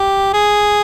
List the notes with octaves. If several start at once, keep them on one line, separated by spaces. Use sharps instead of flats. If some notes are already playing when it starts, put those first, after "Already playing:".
Already playing: G4
G#4